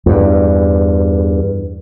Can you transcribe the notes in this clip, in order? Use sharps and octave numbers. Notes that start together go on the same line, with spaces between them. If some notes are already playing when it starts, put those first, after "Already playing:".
E2 G2